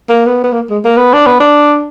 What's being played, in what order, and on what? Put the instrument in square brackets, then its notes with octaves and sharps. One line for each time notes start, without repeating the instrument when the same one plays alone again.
[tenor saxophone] A#3
B3
B3
A#3
G#3
A#3
B3
D4
B3
D4